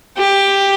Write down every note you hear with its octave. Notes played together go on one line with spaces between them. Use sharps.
G4